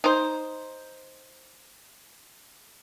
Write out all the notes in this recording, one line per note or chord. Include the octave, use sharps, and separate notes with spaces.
D#4 C5